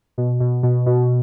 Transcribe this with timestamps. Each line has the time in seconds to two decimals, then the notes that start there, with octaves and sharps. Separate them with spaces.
0.18 B2
0.40 B2
0.63 B2
0.87 B2